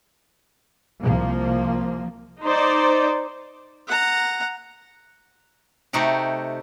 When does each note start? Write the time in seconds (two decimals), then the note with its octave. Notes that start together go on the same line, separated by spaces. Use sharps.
1.01 C2 F3 A#3
2.42 D#4 C5 D5
3.88 F#5 A#5
5.93 C3 A3 D#4 F#4 G4